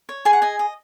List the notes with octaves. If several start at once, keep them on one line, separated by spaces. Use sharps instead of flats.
C#5
G#4 G#5
F#5
D#5 G#5
D#5